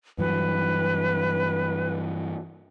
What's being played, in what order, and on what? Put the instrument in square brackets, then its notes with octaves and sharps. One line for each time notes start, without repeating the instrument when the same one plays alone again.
[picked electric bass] G2 E3 F#3 [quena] B4